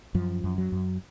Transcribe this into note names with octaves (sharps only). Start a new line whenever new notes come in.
F#2 F3
F#2
F#3
F#2